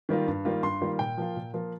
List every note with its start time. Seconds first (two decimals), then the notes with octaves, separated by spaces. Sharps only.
0.09 D#3 G3 A#3 F4
0.28 G2
0.45 D#3 G3 A#3 F4
0.63 G2 C6
0.81 D#3 G3 A#3 F4
0.99 A#2 G5
1.17 F3 A#3 F4
1.36 A#2
1.54 F3 A#3 F4